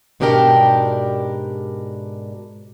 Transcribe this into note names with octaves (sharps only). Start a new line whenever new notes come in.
G#2 B2 D4 G4 A#4 G5